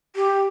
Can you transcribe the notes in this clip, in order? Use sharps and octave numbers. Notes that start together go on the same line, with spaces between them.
G4